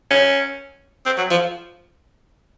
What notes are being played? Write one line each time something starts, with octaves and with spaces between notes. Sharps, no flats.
C#4
C4
F#3
F3